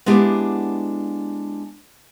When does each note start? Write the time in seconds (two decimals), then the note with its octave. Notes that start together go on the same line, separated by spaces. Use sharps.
0.06 G#3 B3 D4 E4 G4